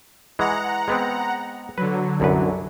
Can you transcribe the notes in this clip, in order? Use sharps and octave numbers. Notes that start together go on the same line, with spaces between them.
E3 G#3 F#5 A#5
G#3 B3 C4
D3 F#3 B4
C2 F#2 B4